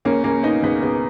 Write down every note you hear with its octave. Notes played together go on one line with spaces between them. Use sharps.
C#2 A#3 C#4
C#2 A#3 C#4
B2 B3 D#4
C#2 B3
C#2 B3